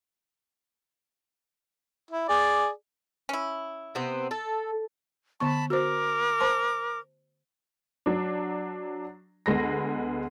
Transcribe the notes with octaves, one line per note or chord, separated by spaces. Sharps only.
E4
G#4 D5
C#4 E4
C3 B3 C4
A4
D3 B3 A5 B5 C#6
F#4 A#4 C5 D6
C5 A5 C6
F#3 D4
D2 G#3 B3 A#6